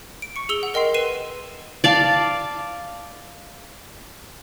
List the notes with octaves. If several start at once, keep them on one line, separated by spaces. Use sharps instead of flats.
D7
C#6 C#7
G#4 E6 F7 G7
F#5
A#4 D#5 G5 C6 C7
B4 C7 D#7 E7
D5 F5 A5